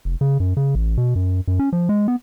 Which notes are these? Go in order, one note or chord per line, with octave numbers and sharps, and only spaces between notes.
F1
C#3
F#2
C#3
A1
B2
F#2
F#2
C#4
F3
G#3
B3